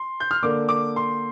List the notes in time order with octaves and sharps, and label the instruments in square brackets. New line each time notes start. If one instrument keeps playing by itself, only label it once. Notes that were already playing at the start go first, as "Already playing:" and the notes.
Already playing: [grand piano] C6
G6
F6
D3 A#3 D4 D6
D6
C6